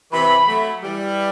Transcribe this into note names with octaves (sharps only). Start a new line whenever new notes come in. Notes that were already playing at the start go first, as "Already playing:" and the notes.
C3 E3 B5
F#3 A3
E3 G3